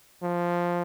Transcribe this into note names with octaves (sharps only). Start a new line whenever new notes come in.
F3